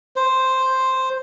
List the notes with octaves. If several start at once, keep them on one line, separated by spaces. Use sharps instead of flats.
C5